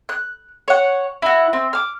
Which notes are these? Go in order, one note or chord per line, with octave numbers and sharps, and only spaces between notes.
F#6
C#5 F#5
E4 F#4
C4
D6 F6